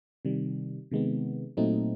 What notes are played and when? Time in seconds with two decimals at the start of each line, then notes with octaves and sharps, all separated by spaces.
0.25 C3 D#3 G3
0.91 C3 D#3 G#3 B3
1.57 A#2 F#3 A3 C4 D#4